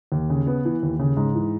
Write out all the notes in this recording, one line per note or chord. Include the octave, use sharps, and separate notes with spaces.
D#2
C#3
B3
E3
D#2
C#3
G#2
E3